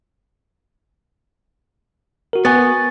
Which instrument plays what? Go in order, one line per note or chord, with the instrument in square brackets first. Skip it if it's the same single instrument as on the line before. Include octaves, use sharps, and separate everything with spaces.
[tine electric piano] F#4 A#4
[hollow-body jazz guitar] B3 [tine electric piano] G#5 C#6 A6